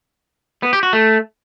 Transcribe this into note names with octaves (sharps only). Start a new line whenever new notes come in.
B3
G4
F#4
A3